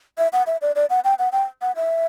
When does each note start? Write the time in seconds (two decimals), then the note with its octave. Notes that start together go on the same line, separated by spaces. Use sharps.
0.18 E5
0.33 F#5
0.47 E5
0.62 D5
0.76 D5
0.90 F#5
1.04 G5
1.19 F#5
1.32 G5
1.62 F#5
1.76 E5